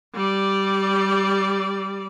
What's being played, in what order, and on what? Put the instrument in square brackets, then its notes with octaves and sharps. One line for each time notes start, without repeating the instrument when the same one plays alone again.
[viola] G3 D5